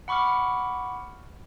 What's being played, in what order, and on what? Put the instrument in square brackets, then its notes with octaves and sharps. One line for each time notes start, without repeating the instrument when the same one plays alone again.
[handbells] F#5 B5 C#6 D6 F6